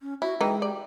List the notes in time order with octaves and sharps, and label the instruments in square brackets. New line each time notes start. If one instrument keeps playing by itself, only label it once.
[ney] C#4
[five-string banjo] E4 [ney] F#4
[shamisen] E3 D#4 [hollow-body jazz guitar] G#3 [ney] G5
[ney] G4 [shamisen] D5